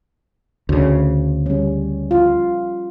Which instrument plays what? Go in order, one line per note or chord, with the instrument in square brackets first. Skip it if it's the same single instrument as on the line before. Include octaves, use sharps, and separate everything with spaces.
[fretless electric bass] D2 C#3
[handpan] G3 C#4
F4